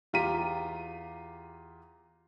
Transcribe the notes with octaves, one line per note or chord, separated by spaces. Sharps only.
E2 F4 G4 A#5 B6 D#7